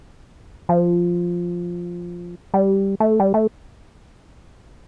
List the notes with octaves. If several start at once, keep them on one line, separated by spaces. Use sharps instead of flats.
F3
G3
A3
G3
A3